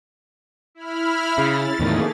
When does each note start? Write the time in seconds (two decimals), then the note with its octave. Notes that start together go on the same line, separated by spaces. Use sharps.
0.75 E4 B5 F6
1.38 C#3 A6
1.79 E2 A2 D#3 A3 A#3 G#4